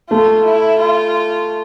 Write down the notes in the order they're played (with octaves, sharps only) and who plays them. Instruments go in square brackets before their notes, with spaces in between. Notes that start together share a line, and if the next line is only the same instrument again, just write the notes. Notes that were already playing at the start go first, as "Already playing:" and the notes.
[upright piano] A3 [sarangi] F4
[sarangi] E4
F4